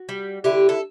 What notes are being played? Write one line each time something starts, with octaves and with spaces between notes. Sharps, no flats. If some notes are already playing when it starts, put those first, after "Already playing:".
Already playing: F#4
G3
D3 E4 G4
A4